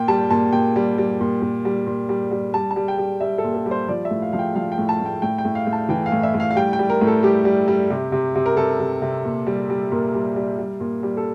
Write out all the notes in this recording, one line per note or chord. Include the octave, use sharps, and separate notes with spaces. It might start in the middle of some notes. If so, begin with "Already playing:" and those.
Already playing: A#2 G5
G3 A5
A#2 A5
A#2 G5
G3
G3
A#2
A#2
G3
A#2
G3
G3
G3 A5
A5
G3
G5
G3
G3 E5
A4
A#2
A4
G3
C5
F3 D5
E5
A2
F5
F3 F5
G5
F3 F5
G5
A2
A5
A2
G5
A2 G5
G5
A2
F5
A2
A5
E3 G5
F5
A2
E5
A2
F5
F5
G3 G5
G5
G3
A#4
A2
A4
G3 G4
G3
G3
C3
C3
C3
A#4
C3 A4
C3
C3
A#2
G3
G3
A#2 A#4
G3
G3
G3
A#2
G3
A4